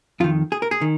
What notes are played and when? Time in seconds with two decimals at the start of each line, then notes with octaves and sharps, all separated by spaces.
0.20 F2 D#3 F4
0.52 G#4
0.62 A#4
0.71 G#4
0.81 D#3